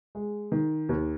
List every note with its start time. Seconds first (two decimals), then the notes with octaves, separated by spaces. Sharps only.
0.15 G#3
0.52 D#3
0.89 D#2